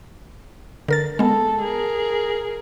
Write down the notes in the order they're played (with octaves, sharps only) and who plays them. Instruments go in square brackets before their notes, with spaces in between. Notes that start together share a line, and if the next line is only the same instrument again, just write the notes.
[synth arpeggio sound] D3 A#4 A6
[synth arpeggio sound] G#3 B3 [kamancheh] A4
[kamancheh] G#4 A#4